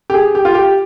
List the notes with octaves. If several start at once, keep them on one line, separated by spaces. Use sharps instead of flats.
G4
G#4
G4
F4
G4